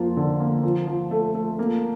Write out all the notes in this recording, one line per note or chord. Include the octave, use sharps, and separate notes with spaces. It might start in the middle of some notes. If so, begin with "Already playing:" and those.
Already playing: F2 F3 A#3 F4
D3
A#3
F3
F3
A3
A3
A#3